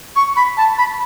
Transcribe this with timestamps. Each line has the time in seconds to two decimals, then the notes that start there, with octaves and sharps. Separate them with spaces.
0.16 C#6
0.36 B5
0.57 A5
0.78 B5